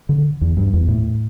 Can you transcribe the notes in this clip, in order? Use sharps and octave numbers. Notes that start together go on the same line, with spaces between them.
D3
E2
G2
E2
A2